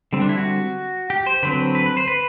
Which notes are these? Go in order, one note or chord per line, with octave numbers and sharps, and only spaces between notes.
D3 G3 C4
D4
E4
F#4
G4
C5
D3 F#3 C4 B4
B4
B4
C5
B4